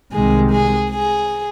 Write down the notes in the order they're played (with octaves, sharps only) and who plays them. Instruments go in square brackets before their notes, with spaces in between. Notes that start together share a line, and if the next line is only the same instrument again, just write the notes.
[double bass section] C2 C3 D#3 G#3 [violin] G#4
[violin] G#4
G#4